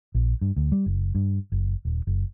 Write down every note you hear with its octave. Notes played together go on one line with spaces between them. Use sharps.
A#1
G2
D2
G3
F#1
G2
F#1
D#1
F#1